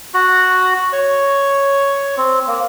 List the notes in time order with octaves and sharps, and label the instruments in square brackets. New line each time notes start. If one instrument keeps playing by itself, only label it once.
[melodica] F#4
C#5
C4
A#3